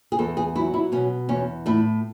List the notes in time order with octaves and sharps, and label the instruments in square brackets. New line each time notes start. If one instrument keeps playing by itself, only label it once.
[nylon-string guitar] G#4
E2 A4
G#4
F#3 E4
E4
B2 C#4
E2 C#4
A2 E4